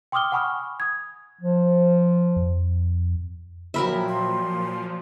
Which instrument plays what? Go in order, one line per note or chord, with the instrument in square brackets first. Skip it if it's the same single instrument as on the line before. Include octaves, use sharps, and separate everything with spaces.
[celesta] G5 C6 D6 D#6 F6 G7
F#5 G#5 B5 C#6 D#6 F6
D#6 G#6
[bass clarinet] F3
[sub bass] F2
[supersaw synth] A#2 F3 [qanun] F#3 A#4 E5 [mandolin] G4 B5
[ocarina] C6